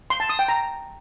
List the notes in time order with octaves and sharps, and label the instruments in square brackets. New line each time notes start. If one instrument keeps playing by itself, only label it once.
[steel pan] C6
A5
D#6
G5
A#5